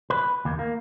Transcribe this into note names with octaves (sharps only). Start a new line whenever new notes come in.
B4
D#2
A#3